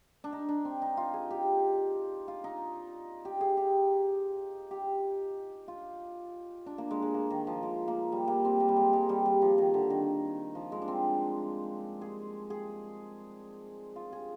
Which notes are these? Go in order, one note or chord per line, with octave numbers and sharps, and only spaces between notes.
D4
D#4
D4
C4
D#4
F4
G#4
G4
F4
D#4
G4
G#4
G4
G4
F4
D4
A#3
G#3
G#3
A#3
D#3
F3
G#3
A#3
G3
A#3
C4
A#3
G3
G#3
G#3
G3
G3
F3
D#3
D3
D#3
F3
G#3
D4
C4
G#4
G#4
F4
G#4